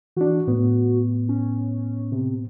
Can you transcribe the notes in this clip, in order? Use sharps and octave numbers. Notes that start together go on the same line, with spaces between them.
E3 D4 F#4
A2 B3
C#4
C3